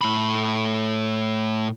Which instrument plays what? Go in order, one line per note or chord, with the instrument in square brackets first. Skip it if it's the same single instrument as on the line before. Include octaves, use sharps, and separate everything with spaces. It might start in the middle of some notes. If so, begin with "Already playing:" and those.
[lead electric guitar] A2 B5